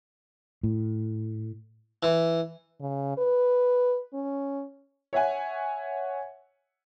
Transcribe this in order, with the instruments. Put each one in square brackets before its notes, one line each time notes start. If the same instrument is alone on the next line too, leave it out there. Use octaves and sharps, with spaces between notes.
[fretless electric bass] A2
[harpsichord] E3
[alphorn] C#3
B4
C#4
[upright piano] C#5 E5 F#5 G#5